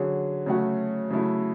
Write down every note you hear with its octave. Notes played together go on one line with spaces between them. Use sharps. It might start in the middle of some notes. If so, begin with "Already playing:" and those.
Already playing: D3 F#3 C#4 G#4
C#3 F#3 A3 C#4 F#4
C#3 F#3 A3 E4